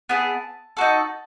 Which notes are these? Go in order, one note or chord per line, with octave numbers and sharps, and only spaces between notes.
B3 E4 G#4 A5
D#4 F#4 A4